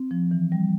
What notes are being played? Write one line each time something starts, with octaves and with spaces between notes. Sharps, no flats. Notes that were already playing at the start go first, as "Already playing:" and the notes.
Already playing: C4
F3
E3
G3